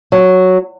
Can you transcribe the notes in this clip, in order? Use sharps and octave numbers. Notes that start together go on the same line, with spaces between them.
F#3